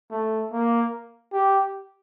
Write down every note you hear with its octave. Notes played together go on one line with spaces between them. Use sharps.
A3
A#3
G4